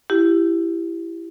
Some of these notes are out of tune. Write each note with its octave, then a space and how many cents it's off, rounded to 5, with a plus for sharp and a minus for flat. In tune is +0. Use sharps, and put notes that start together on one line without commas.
E4 +15 G4 +0